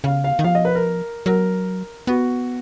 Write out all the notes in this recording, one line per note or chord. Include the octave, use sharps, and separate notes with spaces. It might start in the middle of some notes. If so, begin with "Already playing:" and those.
C#3 F5
F5
D#3
F3 F5
D#5
B4
A#4
F#3 A#4
B3 F#4